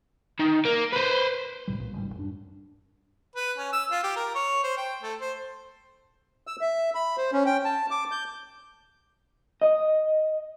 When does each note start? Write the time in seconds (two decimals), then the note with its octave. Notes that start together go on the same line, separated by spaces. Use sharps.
0.39 D#3
0.65 A#3
0.93 B4 C5
1.67 C#2 A2 C3 G3
1.80 C2 A#2
1.94 G#1 C#2 G#2 G3
2.15 F#2 D4
3.36 B4
3.58 C#4
3.73 E6
3.91 F4
4.04 G4
4.16 A#4
4.35 C#5
4.63 C5
4.77 G5
5.02 A3
5.21 C5
6.47 E6
6.61 E5
6.95 B5
7.17 C5
7.33 C#4
7.46 G5
7.65 A5
7.91 D6
8.12 G6
9.62 D#5